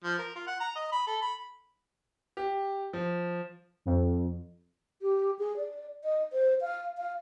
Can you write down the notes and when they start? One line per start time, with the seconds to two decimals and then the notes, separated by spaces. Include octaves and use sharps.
0.04 F3
0.18 A#4
0.35 F4
0.47 F#5
0.60 A#5
0.75 D#5
0.92 B5
1.07 A4
1.22 B5
2.37 G4
2.93 F3
3.85 F2
5.02 G4
5.39 G#4
5.57 D5
6.04 D#5
6.33 C5
6.61 F5
6.98 F5